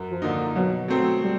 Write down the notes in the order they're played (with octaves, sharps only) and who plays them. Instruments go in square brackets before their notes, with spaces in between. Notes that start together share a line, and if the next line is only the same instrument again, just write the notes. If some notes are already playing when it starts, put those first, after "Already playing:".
Already playing: [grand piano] F#2
[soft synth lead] F3
[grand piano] D3 F3 A#3 D#4
[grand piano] B2 [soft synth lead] F#3
[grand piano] F#3 A3 C4
[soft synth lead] G3